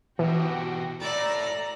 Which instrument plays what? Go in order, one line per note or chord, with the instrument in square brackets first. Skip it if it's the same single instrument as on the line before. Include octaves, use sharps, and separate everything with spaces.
[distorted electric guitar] B2 G4 [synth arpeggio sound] E3 [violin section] F#4 G5
[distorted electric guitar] A3 E4 [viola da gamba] D5 [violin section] A#5